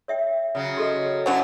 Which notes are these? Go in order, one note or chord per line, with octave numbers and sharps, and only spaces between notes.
C#5 E5 G5
C#3 F#3
F#4 A4 D#5
D3 F#3 C#4 D4 E4